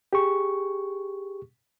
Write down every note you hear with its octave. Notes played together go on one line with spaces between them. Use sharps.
G4 G#4 C#6